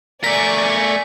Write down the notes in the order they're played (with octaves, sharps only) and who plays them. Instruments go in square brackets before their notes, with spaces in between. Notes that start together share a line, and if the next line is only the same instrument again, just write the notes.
[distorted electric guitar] A3 A#4 [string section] D5 G#5 C#6 [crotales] B6